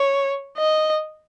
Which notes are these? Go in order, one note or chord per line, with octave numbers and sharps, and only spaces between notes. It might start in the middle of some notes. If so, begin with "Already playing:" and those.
Already playing: C#5
D#5